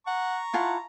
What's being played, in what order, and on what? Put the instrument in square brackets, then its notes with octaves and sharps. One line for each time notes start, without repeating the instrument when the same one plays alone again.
[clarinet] F#5 [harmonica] A#5 C#6
[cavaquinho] E4 F4 A5 [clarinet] F#5